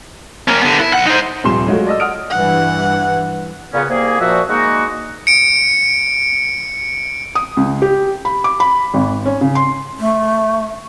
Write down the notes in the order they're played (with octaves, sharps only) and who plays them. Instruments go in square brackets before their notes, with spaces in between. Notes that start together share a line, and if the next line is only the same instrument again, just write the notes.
[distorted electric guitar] A#3 C#4
D3 B3
E4
B1 F#5
D#4 C5
[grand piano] D#1 C3 F3 G3 C6 E7
F#3 G#3 A3 F4 F#4
D5 D#5 E6
F#5 D#6 F6 D7
[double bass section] G2 E3 [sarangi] F#5
[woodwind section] A#2 C#3 B3 C#4
C2 A#3 G#4
A#2 F3 F#4 E5
G#3 A#3 D#4 F#4
[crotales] C#7 D7
[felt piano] D#6
C#2
G4
B5
D6
B5
G#1
C#4
C#3
C6
[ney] A3